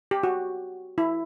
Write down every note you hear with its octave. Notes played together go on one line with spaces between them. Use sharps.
G4
F#4
E4